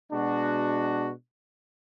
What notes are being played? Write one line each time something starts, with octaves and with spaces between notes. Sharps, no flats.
B2 G#3 D4 F#4